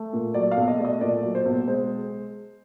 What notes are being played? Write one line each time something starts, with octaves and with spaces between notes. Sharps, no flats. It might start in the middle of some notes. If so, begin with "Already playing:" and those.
Already playing: A3
A#2
F#3 D5
F5
B1
D#5
A3 D5
D#5
A#2 D5
F#3
C5
B1
G#3 C5